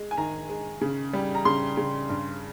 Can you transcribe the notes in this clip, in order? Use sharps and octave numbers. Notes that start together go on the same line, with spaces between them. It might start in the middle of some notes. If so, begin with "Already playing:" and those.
Already playing: G#3
G#5
D#3 A#5
G#3
C#3
G3
A#5
C#3 C6
C#3
G2